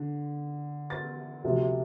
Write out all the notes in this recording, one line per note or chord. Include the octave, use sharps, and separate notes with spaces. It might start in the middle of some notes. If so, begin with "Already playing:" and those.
Already playing: D3
A6
D2 C3 F3